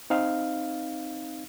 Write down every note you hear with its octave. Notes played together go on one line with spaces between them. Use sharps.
C4 D#4 F5